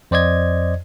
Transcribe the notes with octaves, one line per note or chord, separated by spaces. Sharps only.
F2 C5 D5 D#5 G#6